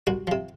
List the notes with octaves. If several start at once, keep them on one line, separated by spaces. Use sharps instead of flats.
C2 F#4
C3 F3